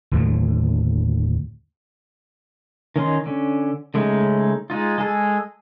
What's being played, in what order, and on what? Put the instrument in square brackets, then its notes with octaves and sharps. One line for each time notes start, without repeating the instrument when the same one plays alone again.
[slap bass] D#2 A2 D3 F#3
[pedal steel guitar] D#3 C#4 D#4 C6
D3 C#4
C#3 G#3 A3 C#4 D#4
G#3 D#4 F4
G#3 G#4 A4